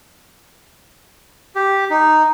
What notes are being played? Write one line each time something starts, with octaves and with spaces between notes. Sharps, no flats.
G4
D#4